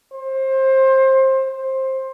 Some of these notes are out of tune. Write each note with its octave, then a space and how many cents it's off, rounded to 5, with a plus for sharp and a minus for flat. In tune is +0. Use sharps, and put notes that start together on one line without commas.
C5 +25
C5 +15